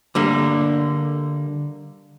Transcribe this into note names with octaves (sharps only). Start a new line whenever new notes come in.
D3 G3 A#3